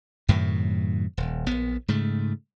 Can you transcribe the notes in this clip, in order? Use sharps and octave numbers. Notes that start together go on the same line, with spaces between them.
F#2 A2 C3 D#3
D#1
A#1 B3
G#2 C#3 A3